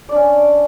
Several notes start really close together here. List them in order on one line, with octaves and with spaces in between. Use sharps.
D5 D4 C#4